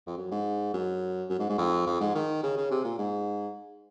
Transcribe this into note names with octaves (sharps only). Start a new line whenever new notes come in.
F2
F#2
G#2
F#2
F#2
G#2
G#2
F2
F2
G#2
D#3
C#3
C#3
C3
A#2
G#2